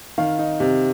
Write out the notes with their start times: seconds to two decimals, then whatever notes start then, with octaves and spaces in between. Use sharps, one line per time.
0.18 D#3 F5
0.39 D#4
0.60 C3